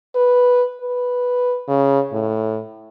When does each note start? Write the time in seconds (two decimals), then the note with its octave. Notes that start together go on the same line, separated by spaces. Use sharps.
0.15 B4
0.81 B4
1.68 C#3
2.12 A2